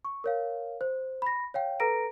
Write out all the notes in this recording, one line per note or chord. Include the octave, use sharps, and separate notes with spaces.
C#6
A#4 C#5 F5
C5
B5 A#6
C#5 F5 G5
A4 B4 A#5 A#6 D7